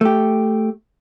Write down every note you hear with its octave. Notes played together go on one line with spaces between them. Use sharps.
A3 G4